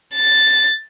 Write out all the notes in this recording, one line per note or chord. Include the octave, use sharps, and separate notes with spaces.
A6